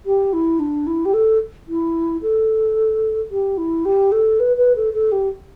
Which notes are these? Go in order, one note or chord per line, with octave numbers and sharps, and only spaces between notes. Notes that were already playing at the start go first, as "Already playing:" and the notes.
G4
E4
D4
E4
G4
A4
E4
A4
G4
E4
G4
A4
B4
B4
A4
A4
G4